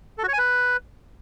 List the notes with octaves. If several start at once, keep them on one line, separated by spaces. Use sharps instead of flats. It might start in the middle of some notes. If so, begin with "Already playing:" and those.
A4
F#4
C#5
G#5
B4